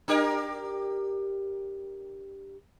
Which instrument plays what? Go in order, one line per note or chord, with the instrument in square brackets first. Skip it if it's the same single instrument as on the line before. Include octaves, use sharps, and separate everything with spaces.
[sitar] D4 G4 A#4